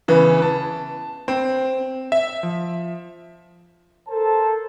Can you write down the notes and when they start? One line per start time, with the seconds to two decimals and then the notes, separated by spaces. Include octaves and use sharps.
0.08 C#3 E3 B3
0.42 A5
1.28 C4
2.12 E5
2.43 F3
4.08 A4 A#4 C5 A5